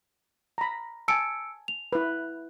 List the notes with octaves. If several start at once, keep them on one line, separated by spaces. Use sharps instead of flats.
A#5 B5
G#5 A5 E6 C#7 D7
F7
E4 B4